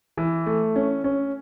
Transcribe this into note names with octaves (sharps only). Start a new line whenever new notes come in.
E3
A3
C#4
C#4